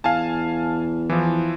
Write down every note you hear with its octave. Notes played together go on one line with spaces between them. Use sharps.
E2 F5 G#5 A5
E3 F3